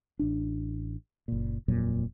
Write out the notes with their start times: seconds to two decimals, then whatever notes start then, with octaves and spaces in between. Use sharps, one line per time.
0.19 A1 D4
1.28 F#1 A#2
1.68 D#1 F2 A#2 F#3